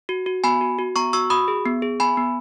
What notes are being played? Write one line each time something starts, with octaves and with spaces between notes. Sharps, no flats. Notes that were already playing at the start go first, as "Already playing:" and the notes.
F#4
F#4
B3 G#5 B5
F#4
F#4
B3 A#5 C#6
F#4 C#6 E6
F#4 B5 D#6
G#4
B3
G#4
B3 G#5 B5
B3